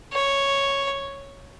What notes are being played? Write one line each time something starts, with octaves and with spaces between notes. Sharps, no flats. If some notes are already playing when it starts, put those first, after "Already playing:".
C#5